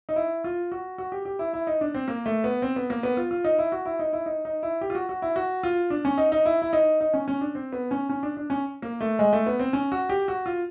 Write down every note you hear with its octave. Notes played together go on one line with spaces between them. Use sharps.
D#4
E4
F4
F#4
F#4
G4
G4
E4
E4
D#4
D4
C4
A#3
A3
B3
C4
B3
A#3
B3
F4
F4
D#4
E4
F#4
E4
D#4
E4
D#4
D#4
E4
G4
F4
F#4
F#4
E4
F#4
F4
D4
C#4
D#4
D#4
E4
E4
D#4
D#4
C#4
C#4
D4
C4
B3
C#4
C#4
D4
D4
C#4
A#3
A3
G#3
A3
B3
C4
C#4
F#4
G4
F#4
F4